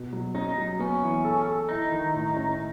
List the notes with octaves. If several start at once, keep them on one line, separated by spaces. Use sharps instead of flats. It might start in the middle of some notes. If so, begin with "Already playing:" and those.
Already playing: B2
F#3
C#4 D#4
F#3
B3 C#4
E3
A4
A4
D#4 E4
D#3
A2
C#4